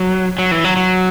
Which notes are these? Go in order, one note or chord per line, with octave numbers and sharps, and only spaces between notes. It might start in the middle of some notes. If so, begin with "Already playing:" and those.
Already playing: F#3
F#3
E3
F#3
F#3